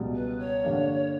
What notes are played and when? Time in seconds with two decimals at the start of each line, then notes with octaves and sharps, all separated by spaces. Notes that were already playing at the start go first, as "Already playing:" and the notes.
Already playing: C#2 B2 G3
0.14 B4
0.39 C#5
0.64 G2 D3 G3 A#3 D4